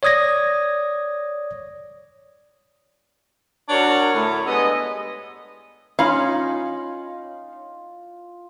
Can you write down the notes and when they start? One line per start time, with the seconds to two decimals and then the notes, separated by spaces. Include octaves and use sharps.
0.03 C#5 D5 D#6 G#6 A#6
3.69 D4 F#4 A#4 C#5
4.12 A2 D3 A3 C#4 C#5
4.45 G2 G#3 B3 A4 D#5
5.99 C#4 D#4 F4 F5 B5